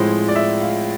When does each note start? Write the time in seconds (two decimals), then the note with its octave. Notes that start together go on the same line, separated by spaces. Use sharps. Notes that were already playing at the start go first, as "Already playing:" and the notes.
Already playing: A2 F3 G#3 C4 E4 C5
0.28 D5
0.36 E5
0.61 F5